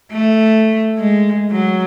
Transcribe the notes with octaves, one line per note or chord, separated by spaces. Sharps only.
A3
G#3
F#3